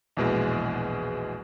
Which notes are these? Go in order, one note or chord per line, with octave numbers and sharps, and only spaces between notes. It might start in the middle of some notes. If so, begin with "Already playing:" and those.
A#1 E2 B2 E3 G#3